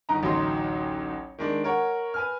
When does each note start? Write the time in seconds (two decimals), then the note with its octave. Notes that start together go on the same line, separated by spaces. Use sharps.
0.09 G1 D#4 A#5
0.23 A1 D2 F#3 D#4 C6
1.39 D#3 G#3 D4
1.64 A#4 C#5 F#5
2.14 B4 G#5 F6